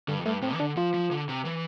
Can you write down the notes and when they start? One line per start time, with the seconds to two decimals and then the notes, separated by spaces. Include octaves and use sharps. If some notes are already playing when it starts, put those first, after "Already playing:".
0.08 G2 D3
0.19 F2
0.25 G2 A3
0.42 A2 C4
0.54 E3
0.60 D3 D4
0.77 F3 F4
0.94 F3
1.11 D3
1.29 C3
1.45 E3